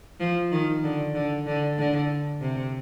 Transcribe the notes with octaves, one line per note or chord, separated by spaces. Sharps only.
F3
D#3
D3
D3
D3
D3
C3